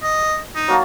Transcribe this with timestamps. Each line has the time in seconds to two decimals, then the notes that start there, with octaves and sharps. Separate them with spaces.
0.03 D#5
0.55 D#4
0.68 F#3 A#3 A5